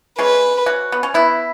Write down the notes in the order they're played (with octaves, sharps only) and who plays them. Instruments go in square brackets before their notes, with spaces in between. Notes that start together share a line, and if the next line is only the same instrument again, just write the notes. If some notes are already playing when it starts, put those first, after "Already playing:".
[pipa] G#3 C#4 [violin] B4
[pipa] C#4 F#4
B3
C#4
B3 E4